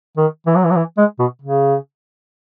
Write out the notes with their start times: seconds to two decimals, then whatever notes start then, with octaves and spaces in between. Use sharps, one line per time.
0.17 D#3
0.46 E3
0.55 F#3
0.64 E3
0.70 F#3
0.75 E3
0.97 G#3
1.19 B2
1.42 C#3